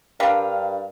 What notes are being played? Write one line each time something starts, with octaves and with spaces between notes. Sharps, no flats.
G2 G3 C4 D4 A#4 F5